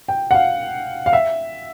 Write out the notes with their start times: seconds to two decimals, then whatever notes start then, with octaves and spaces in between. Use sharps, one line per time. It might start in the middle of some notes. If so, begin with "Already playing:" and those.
0.08 G5
0.31 F#5
0.34 F5
1.06 F5
1.13 E5